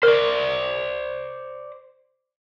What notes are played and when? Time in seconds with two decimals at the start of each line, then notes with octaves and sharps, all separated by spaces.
0.03 A#4 C5 D5